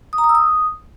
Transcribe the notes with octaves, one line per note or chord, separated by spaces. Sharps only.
D#6
A#5
D#6
E6
D#6